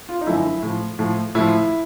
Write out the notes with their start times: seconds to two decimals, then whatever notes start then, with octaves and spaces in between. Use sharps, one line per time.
0.09 F4
0.21 D#4
0.27 F#2 D3 F3 E4
0.62 A2 F3
0.99 A2 F3
1.35 A2 F3 E4